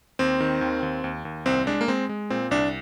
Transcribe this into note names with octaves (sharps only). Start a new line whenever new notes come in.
D#2 C4
D#3
D#2
D#2
D#2
D#2
C2 C4
G#3 D4
A#3
G#3 C4
G#3
A#2 C4
C2 D4